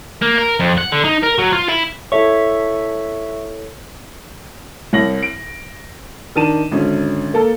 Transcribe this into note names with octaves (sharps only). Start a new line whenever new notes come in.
A#3
A#4
F2
F#5
D3
D#4
A#4
F#3
F4
E4
E4 A4 C#5 E5 C#6
C2 C#5 A#6 F#7
D7
D#3 D4 A5 D#7 E7
G#1 D3 C#4
A#3 A4